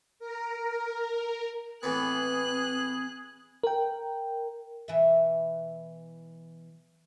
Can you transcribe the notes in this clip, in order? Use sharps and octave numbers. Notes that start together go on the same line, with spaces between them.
A#4
A2 E3 B3 C4 G#4 F#6
A#4 G5
B2 E3 E5